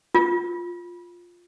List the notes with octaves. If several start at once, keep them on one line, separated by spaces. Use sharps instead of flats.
F4